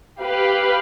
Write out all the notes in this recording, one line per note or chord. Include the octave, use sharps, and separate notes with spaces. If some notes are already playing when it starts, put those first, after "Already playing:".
G4 B4 F5